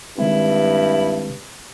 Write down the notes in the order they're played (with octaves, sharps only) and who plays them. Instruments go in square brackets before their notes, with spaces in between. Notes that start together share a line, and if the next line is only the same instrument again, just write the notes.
[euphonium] G2 [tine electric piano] D#3 G#3 C4 [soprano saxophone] E4